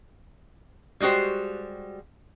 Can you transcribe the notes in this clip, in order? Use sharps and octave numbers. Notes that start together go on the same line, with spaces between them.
G3 G#3 F#4 G4 C5